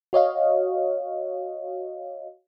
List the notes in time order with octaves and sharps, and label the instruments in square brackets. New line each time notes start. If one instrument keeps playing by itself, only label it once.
[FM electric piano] F#4 C#5 D#5 F5